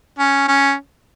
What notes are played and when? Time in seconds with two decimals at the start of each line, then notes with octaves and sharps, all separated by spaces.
0.19 C#4
0.48 C#4